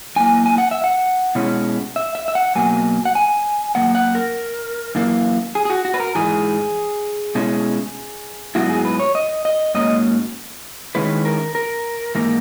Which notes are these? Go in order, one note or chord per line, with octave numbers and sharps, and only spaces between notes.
F#2 E3 A#3 G#5
G#5
F#5
E5
F#5
B2 G#3 C#4 E4
E5
E5
E5
F#5
B2 F#3 A#3 G#5
F#5
G#5
F#2 E3 A#3 F#5
F#5
A#4
F#2 E3 A#3
G#4
G#4
F#4
F#4
B4
A#4
G#2 E3 G#3 G#4
B2 G#3 C#4 E4
G#2 F#3 B3 E4 F#4
G#4
B4
C#5
D#5
D#5
G#2 F#3 A#3 C#4 D#5
D#3 G#3 C#4 E4 B4
A#4
A#4
G#2 E3 A#3 A#4